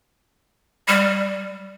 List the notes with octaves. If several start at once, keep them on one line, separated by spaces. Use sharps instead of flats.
G3